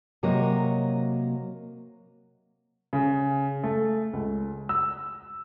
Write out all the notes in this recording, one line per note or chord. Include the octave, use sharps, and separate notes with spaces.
C3 F#3 A#3 C#5 D#5
C#3
A3
C#2
E6